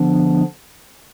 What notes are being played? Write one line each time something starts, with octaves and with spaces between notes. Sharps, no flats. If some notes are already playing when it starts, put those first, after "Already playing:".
Already playing: D3 F3 B3 D4